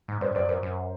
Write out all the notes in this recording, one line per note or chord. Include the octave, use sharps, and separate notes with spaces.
G#2
G2 C5 D5
F#2 C5 D5
F#2 A#4 C5
F#2